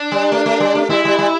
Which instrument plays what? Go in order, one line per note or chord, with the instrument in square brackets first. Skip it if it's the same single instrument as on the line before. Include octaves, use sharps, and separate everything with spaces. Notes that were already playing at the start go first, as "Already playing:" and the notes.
Already playing: [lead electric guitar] D4
[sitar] G3
A3
A3
G3
A3
[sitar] G3 [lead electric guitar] E4
[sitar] G3
G3